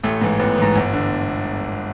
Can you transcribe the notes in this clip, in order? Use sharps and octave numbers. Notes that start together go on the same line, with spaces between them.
A1 A3
G#2 E3
A1 B3
G#2 E3
G1
D3